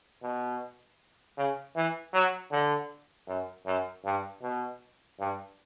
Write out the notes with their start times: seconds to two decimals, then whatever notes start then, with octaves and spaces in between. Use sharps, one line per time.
0.22 B2
1.37 C#3
1.76 E3
2.14 F#3
2.52 D3
3.28 F#2
3.66 F#2
4.05 G2
4.42 B2
5.20 G2